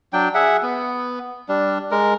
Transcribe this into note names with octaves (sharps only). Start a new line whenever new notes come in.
F#3 D4 G5
G#4 E5 F#5
B3
G3 D4
G#3 A#4